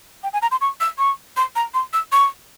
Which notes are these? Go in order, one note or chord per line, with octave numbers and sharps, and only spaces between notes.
G5
G#5
A#5
C6
C#6
E6
C#6
C6
A#5
C6
E6
C#6